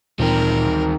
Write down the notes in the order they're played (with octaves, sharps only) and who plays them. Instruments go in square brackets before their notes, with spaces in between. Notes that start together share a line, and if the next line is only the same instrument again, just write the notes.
[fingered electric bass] D2 E3 G3 [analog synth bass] A#2 [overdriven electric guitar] D#3 C4 [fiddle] A#4